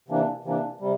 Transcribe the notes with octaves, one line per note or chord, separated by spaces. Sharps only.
C3 E3 A#3 D4
C3 E3 A#3 D4
C3 G3